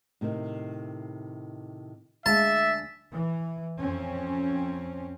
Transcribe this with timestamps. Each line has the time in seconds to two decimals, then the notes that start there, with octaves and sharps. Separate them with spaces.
0.21 A2 C3 D#3
2.26 D2 G#3 E5 F5 A5
3.13 E3
3.81 F2 C4 C#4